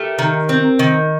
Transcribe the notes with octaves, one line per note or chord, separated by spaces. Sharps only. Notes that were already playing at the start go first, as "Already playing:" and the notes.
Already playing: A3 G4 A#4
D#3
C4
D#3